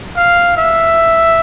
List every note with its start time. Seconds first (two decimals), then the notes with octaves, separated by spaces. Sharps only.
0.17 F5
0.57 E5